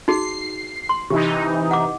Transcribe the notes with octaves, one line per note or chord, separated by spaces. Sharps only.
D#4 F#4 G#4 C7
C6
C3 E3 D#4 G4
F#5 D6